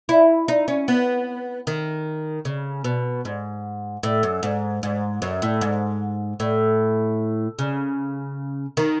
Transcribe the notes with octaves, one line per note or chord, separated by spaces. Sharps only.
E4
D#4
C#4
B3
D#3
C#3
B2
G#2
A2
F#2
G#2
G#2
F#2
A2
G#2
A2
C#3
D#3